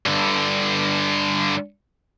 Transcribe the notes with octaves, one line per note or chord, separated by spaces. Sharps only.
G2 D3